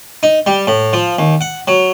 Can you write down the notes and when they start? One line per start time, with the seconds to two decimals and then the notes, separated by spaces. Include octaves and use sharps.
0.23 D#4
0.46 G3
0.67 A2
0.93 F3
1.19 D#2
1.41 F#5
1.68 F#3